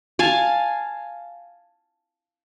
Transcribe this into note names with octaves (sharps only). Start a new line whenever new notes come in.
F5 G#5 A5